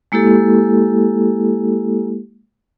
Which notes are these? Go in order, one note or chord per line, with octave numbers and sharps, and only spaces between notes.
G#3 A#3 E4 G4 A4